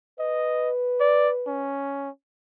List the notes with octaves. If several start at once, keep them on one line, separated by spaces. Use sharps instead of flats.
B4 D#5
D5
C#4